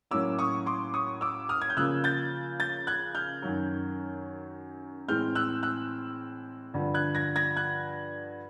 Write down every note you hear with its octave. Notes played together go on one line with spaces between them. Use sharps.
A2 F#3 A#3 C#4 D6 E6
C#6 D#6
C6 D6
C#6 D#6
D6 E6
D#6 F6
G#6
G6
C#3 F3 A#3 E6 F#6
G6 A6
G6 A6
F#6 G#6
F6 G6
F#2 D#3 F#3
A2 E3 G#3 C4 F6 G6
E6 F#6
E6 F#6
G2 D3 F3
F#6 G#6
G#6 A#6
G#6 A#6
F#6 G#6